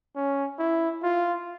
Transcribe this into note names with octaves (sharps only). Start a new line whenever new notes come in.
C#4
E4
F4